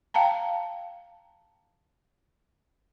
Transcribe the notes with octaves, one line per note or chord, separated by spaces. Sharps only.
F5 G5 A5 A#5